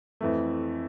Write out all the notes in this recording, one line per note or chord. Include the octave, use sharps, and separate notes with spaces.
F2 E3 A3